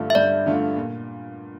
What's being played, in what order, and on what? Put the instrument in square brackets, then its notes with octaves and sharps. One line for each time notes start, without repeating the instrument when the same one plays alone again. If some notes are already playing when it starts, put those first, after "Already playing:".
Already playing: [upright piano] G2 D3 A3 D4 F4
[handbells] E5
[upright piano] G2 [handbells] D5
[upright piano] D3 A3 D4 F4
A#2